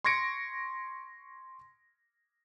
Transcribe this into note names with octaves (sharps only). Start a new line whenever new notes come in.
C6 C#6 G#6 A#6 C#7 D7